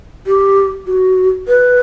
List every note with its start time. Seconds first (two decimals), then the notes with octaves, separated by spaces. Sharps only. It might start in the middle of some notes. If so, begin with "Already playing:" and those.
0.27 G4
0.87 F#4
1.48 B4